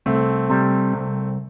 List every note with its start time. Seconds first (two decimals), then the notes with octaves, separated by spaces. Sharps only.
0.06 C2 A3 C4
0.50 C3 G3
0.93 C2